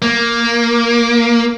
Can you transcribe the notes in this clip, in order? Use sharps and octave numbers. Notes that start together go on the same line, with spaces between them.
A#3